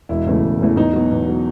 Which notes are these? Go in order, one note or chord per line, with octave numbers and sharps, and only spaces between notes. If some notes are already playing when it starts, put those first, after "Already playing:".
E1 E4
E2 C#3 E3 A3
E1
E2 C#3 E3 A3
E2 D#4
B2 F#3
E2
B2 F#3